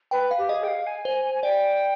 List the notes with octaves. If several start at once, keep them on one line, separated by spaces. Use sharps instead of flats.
B4 G5
F5
G4
G#4 D#5
G5
F5
G#5
C5 G#5
G#5
G#5
D5 G5